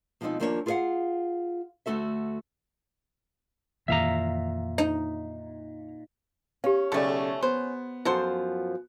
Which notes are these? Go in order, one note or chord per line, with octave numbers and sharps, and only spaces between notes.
B2 F3 G#3 A3 C4 D#4
D#2 F3 A#3 D4 A4 C#5
F4 G#4 A#4 D5 F5 F#5
D2 A3 F#4 A4 E5
F2 A#2 D#3 E3 E5 F5 A#5
D#4
C#4 G4 F5
B1 C#3 A3 A4 D5
B3 C5
F#2 F3 F#4 A4 C5